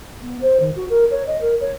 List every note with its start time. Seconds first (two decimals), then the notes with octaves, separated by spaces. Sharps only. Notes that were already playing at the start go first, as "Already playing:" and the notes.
0.22 B3
0.41 C5
0.60 D#3
0.76 F#4
0.90 A#4
1.11 C#5
1.26 D#5
1.41 A#4
1.60 C#5